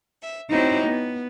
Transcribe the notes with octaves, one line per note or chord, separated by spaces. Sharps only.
E5
C4 D#4 E4 F#4 G4 C#5
B3